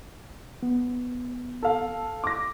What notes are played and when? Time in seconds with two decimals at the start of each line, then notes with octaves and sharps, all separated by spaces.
0.63 B3
1.63 A4 F5
2.24 D6 A#6